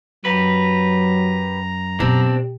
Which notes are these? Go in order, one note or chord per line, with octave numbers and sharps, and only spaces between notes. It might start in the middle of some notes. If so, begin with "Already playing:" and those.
F#2 F#3 G4 B4 A#5
B2 C4 D4 G4